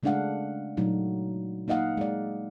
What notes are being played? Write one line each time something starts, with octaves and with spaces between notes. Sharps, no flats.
C#3 G#3 A3 D4 F5 F#5
A#2 F#3 A3 D#4 F#4
A#3 D#4 D#5 F5 F#5
G#3 D5